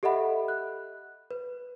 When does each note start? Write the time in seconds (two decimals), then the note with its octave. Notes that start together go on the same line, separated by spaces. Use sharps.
0.03 G4 A4 D#5 E5 F#5 B5
0.48 F#6
1.31 B4